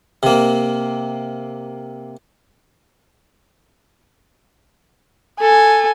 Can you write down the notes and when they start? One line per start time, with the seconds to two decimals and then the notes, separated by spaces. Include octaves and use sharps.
0.23 C3 A#3
5.41 A4 G#5